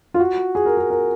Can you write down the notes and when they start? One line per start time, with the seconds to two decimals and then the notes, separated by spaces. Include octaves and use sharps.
0.14 F4
0.20 F#4
0.55 G#4
0.65 A#4
0.77 G#4
0.90 A#4